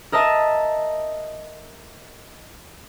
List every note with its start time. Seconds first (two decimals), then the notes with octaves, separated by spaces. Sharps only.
0.12 A#4 D#5 E5 A5